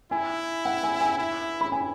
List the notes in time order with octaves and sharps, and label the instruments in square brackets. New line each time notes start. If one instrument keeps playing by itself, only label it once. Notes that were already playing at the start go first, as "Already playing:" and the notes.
[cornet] E4 [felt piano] G#5
[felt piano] F#5
G#5
G#5
[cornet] E4
[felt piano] B5
G#5